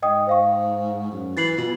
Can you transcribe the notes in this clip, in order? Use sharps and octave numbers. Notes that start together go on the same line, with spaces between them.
G#2 D#5 G5 D#6
C5 F5 C#6
F#2
E3 A6 C7 F#7
B2 F4